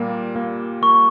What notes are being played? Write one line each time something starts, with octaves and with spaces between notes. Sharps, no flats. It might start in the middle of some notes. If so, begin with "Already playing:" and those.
Already playing: A#2 G3 A#3
A#3
A#3 C#6